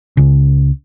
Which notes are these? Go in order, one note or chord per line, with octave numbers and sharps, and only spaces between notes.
C#2 C#3